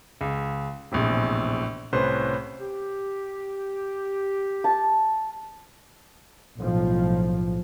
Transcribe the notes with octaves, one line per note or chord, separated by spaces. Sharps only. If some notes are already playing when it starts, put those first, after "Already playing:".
C#2
A#1 E2 A2 C3
C2 A2 C#4 B4 C5
G4
A5
B1 A2 F3